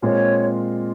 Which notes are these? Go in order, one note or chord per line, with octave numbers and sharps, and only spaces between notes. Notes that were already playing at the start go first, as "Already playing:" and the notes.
A#2 G#3 C4 F4 C#5